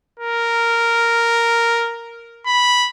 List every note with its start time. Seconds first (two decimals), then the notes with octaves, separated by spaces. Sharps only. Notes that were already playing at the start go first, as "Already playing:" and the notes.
0.19 A#4
2.46 B5